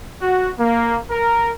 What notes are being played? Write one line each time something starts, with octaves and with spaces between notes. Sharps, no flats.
F#4
A#3
A#4